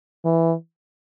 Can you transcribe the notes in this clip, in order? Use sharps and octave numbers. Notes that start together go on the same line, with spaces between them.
E3